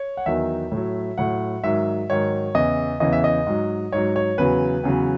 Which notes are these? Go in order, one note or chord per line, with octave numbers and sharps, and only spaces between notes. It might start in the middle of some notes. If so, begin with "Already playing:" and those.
Already playing: C#5
F#5
E2 D#3 F#3 E5
A2 F#3
A2 F#3 F#5
G#2 D#3 F#3 E5
G#2 D#3 F#3 C#5
E2 C#3 E3 D#5
E2 C#3 E3 D#5
E5
D#5
G#2 F#3
G#2 F#3 C#5
C#5
E2 C#3 F#3 B4
E2 C#3 F#3